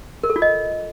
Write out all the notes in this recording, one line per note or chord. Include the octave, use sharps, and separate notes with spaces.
A#4
A4
F4
D#5